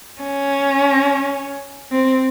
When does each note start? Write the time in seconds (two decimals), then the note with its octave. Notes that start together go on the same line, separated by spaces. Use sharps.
0.21 C#4
1.91 C4